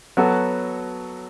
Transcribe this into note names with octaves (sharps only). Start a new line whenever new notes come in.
F#3 B3 F#4 A4